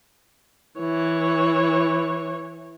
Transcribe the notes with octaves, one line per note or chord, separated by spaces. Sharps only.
E3 C#5